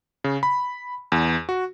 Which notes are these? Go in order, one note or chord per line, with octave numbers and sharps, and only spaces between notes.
C#3
B5
E2
F#4